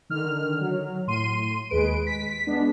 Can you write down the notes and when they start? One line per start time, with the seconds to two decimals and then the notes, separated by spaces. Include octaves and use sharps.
0.10 D3 D#3 F6
0.60 F#3
1.07 A2 C6 D#7
1.70 D#2 G#3 B4 D7
2.07 B6
2.47 G#3 B3 D4